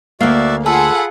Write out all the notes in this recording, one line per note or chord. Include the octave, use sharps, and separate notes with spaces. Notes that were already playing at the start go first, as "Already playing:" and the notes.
D2 A#3 F#4 D5 E5 F5
F4 G#4 A4 F#5 B5